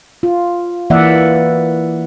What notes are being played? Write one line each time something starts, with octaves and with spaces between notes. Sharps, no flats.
F4
E3 A#3 D5 E5 F#5